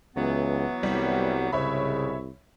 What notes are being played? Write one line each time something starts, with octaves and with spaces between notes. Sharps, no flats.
C#2 E3 F#3 B3
C2 G3
C2 G#2 C#3 C#5 E5 B5